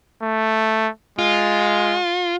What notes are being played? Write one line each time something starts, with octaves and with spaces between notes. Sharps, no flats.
A3
G#3 F4